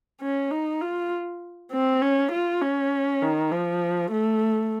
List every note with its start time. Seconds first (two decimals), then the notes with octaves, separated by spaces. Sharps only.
0.22 C#4
0.51 D#4
0.81 F4
1.72 C4
2.02 C#4
2.32 F4
2.61 C#4
3.22 D#3
3.51 F3
4.11 A3